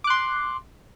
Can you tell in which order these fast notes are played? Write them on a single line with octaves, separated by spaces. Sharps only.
D6 F#6 C6